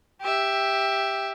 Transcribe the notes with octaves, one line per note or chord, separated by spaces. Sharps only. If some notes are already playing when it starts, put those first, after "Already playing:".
G4 E5